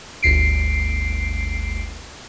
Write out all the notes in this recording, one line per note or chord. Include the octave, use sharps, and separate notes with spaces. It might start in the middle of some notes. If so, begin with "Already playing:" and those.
G1 D2 C7 D7